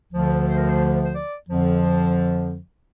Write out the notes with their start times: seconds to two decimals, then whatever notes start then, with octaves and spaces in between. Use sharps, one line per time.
0.13 D2 D3 F3
0.47 C5
0.57 A#4
0.67 C5
1.05 C5
1.15 D5
1.49 F2 D3 F3
1.83 C5